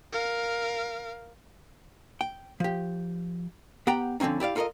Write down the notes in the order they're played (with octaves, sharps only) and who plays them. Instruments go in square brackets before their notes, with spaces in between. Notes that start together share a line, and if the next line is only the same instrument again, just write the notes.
[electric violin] A#4 F5
[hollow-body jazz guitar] G5
F3 G4
B3 G4 F#5 G5 A#5
D3 F3 C4 C#4 D#4
E4 G4 D5 F5
F4 A4 A#4 D5 D#5